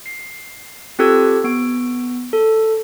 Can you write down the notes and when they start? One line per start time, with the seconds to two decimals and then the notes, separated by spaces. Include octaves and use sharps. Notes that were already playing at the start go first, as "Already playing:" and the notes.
0.06 C7
0.99 C4 F4 G4 A4 E6 G#6
1.44 B3 D7
2.33 A4